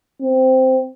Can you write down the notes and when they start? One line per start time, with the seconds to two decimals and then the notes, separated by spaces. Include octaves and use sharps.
0.21 C4